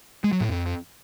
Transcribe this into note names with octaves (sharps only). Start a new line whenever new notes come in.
G#3
F#3
A2
F2